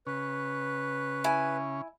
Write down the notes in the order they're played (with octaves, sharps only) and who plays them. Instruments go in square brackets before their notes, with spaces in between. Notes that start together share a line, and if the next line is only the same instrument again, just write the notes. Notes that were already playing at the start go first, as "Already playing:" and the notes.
[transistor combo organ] C#3 C#4 [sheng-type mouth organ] B4
[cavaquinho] E4 G#5